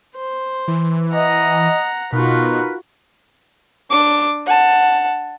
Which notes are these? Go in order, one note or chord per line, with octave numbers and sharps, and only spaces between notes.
C5
E3
D#5 F#5 A#5
B2 D#4 F4 F#4 A#4 B4
D4 D6
F#5 A5